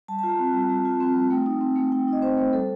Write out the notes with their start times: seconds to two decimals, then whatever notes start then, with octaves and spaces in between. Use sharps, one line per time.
0.08 G3 A5
0.19 A5
0.23 F4
0.29 A#5
0.39 C4
0.54 G3
0.69 G3
0.85 F4
1.00 C4
1.16 G3
1.30 A3 G5
1.46 D#4
1.61 C4
1.76 A3
1.92 A3 G5
2.08 D#4 D#5
2.22 C4 C5
2.37 A3 C5
2.53 G3 A4